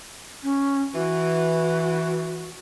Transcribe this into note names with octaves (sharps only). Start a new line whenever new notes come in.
C#4
E3 F#4